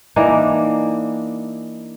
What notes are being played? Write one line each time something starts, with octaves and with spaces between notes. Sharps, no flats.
E3 A#3 D4 D#4